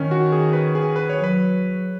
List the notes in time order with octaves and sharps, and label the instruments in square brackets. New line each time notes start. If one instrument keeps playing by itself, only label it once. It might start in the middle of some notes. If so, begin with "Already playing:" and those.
Already playing: [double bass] D#3 [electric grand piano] C#4
[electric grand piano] F#4
G#4
B4
G#4
B4
C#5
[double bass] F#3
[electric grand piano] B4